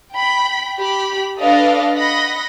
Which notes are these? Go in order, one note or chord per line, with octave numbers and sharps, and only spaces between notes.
G5 B5
G4 B5
D4 A4 B4 D5 D#5 F5
D#5 F#5 B5 A#6